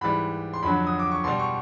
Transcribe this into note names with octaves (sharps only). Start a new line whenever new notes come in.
G#2 E3 G3 B5
C6
F2 D3 F#3 B5
D#6
D6
C#6
B2 G3 C6
C#6